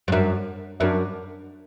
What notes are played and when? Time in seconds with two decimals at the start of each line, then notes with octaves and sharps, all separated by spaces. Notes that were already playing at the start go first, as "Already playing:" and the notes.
0.08 G2
0.12 F#2 D4 A#4 E5
0.80 F#2 D4 A#4 E5